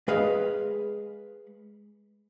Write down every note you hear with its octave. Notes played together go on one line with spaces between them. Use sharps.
G#3 G#4 B4 D#5 F5